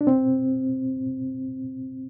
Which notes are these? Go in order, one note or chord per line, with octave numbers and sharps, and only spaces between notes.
D4
C4